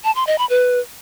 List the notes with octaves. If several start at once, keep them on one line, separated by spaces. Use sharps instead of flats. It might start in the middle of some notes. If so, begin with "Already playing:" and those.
A5
C6
D#5
B5
B4